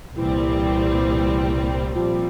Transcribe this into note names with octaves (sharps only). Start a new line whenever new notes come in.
C2 A#2 E3 G3 C4
A#1 A#2 F3 G3 C4